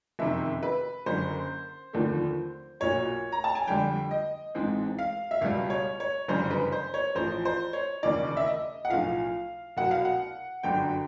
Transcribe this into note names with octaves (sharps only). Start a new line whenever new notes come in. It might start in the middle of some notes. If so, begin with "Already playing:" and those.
F#1 F2 C3 D#3 E5
B4
F#1 F#2 D3 C5
F1 D#2 D3 F3 A3
B1 A#2 F#3 C#5
A#5
A5
G#5
F2 D3 G3 G5
D#5
A1 G#2 E3 G#3 C4
F5
E5
C#2 B2 G3 F5
C#5
C#5
G1 F#2 C#3 E3 G3 C5
B4
C5
C#5
A1 A2 F3 C5
C5
C#5
E1 D#2 C#3 E3 D5
E5
D#5
F#5
B1 A2 F3 F5
C2 B2 F#3 F#5
F5
F#5
G1 F#2 D3 F#3 G5